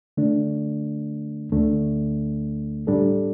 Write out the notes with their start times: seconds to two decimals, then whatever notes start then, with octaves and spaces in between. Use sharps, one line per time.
0.17 D3 A3 D4
1.52 D2 D3 A3 D4
2.87 A2 G3 D4 A4